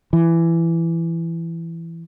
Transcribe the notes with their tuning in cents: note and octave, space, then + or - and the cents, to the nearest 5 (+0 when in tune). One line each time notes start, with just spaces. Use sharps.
E3 +15